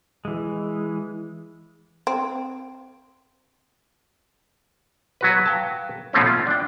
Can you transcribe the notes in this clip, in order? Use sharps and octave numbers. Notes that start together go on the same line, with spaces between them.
E3 G#3
C4
F#3 F#4 B4
F5 G5 A5
B2 F3 A3 C4 C#4
F4 E5
D4 G5